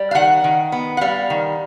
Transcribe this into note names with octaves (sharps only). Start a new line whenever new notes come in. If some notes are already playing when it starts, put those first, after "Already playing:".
Already playing: G3
F5
D#3 F#5
D#3
B3
F#5
G3 F5
D#3